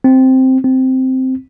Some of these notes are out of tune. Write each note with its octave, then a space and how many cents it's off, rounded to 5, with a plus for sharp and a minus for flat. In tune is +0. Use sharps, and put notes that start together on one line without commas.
C4 +0
C4 -5